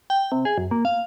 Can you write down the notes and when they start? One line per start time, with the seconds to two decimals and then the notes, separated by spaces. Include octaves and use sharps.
0.10 G5
0.32 C3
0.45 G#4
0.58 F#2
0.71 A#3
0.85 F5